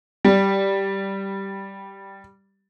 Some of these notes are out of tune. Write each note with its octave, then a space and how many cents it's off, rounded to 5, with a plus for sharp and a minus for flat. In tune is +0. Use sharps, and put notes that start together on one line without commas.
G3 -5